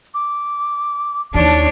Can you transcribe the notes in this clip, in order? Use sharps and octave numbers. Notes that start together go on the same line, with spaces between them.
D6
D#2 E3 D4 C#5 A5